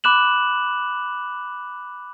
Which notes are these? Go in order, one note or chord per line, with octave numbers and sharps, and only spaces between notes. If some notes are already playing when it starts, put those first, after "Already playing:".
B5 D6 F#6 E7 F#7